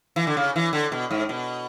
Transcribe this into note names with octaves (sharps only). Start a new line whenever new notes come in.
E3
D3
C#3
E3
D3
B2
G#2
B2